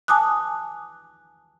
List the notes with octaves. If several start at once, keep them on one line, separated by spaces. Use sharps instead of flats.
G#5 A5 D6 D#6 F#6